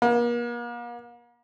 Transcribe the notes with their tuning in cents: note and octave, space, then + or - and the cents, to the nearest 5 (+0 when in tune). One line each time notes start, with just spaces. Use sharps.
A#3 +40